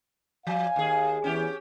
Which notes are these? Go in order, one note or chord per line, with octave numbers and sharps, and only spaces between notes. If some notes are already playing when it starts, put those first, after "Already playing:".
F3 F5 G#5
D#2 G#4
E2 C#4 G4